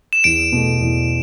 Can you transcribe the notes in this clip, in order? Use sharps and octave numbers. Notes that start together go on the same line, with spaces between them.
E7
E2 D7
B2 A3
E2